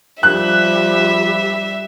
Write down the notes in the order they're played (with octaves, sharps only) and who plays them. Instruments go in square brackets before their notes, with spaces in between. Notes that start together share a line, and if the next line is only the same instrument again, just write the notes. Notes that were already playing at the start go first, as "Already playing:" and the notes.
[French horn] F3 [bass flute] G3 [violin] E5 [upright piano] F#6